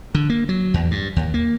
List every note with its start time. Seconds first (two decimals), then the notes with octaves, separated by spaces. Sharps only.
0.15 D3
0.30 A#3
0.49 F#3
0.74 E2
0.91 G2
1.16 D#2
1.34 A#3